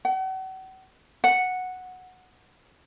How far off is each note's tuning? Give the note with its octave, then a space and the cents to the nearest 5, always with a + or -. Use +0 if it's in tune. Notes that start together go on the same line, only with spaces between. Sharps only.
F#5 +40
F#5 -5